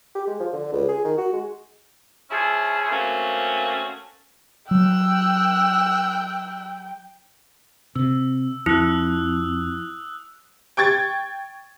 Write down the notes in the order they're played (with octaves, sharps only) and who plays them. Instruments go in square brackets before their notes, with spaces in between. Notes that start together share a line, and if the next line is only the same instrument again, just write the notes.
[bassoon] G4
G#3
F3
D3
C#2
G#4
D#3
F#4
G#3
[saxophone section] F3 C#4 E4 G#4
A3 A#3 C4 C#4 F#4
[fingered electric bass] F#3 [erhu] G5 [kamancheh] E6 F#6
[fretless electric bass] C3 [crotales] E6
[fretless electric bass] F2 [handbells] E4 [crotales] D#6 E6 F#6
[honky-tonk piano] G5 C#6 G#6 A6